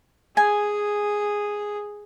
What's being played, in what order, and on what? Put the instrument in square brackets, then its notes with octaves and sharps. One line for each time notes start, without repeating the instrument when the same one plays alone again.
[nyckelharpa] G#4 [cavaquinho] G#5